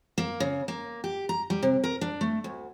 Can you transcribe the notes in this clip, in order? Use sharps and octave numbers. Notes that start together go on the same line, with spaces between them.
A#3
C#3
A#3
G4
A#5
G3
C3
A#4
D4
A3
D2